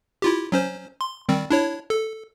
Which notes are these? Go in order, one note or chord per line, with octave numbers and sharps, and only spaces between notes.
E4 F4 G4
F#3 C#4 C5
C6
D#3 G3 C4
D4 E4 C#5
A4